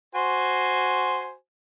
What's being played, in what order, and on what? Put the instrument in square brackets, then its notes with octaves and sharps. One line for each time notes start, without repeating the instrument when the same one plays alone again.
[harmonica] F#4 C5 G#5